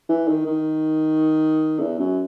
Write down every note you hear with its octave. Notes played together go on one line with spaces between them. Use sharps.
E3
D#3
D#3
E2
F#2